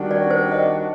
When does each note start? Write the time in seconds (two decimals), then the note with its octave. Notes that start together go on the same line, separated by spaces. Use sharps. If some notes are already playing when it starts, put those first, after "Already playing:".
Already playing: D#3 G3 D4 F#4
0.11 D5
0.31 C5
0.52 D#5